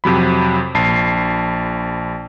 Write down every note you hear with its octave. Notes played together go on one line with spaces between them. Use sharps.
F2 C3 F#3 B5
A#1 A5 C7